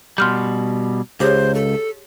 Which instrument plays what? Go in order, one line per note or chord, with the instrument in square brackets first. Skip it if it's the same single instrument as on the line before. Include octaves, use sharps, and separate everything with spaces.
[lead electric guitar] B2 G3 [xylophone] C6 F6 G6
[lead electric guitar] C#2 [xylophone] G4 G#4 C#5 [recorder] C5
[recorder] A4